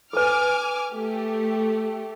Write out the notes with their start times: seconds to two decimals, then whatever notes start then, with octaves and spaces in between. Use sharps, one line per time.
0.13 A4 B4 G#5 D6 F6
0.92 A3 G4